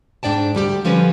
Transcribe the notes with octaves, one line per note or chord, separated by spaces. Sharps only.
G#2 D4 D5 G5 A5
D2 G3 G4
D3 F3 G3 C#4 B4